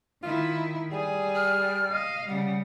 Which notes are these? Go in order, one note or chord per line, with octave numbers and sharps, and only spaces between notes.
D#3 E4 F4
G3 G#4
F6
D#5 F5
C#3 G3 F#5